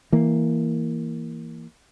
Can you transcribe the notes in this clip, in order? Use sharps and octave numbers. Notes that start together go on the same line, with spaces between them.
E3 A#3